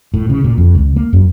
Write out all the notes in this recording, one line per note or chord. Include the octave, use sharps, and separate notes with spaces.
A2
C#3
A#2
F2
C#2
A#3
F#2